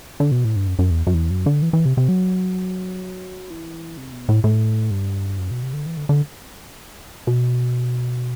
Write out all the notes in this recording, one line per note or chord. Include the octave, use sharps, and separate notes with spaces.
D3
B2
A2
G2
F#2
F#2
E2
F#2
E2
F#2
D3
E3
E3
C3
C3
F#3
E3
C3
B2
A2
A2
G2
F#2
B2
C3
D3
E3
D3
D3
B2